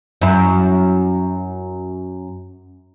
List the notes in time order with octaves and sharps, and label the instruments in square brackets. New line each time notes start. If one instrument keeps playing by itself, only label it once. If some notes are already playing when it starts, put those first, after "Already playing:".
[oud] F#2 E4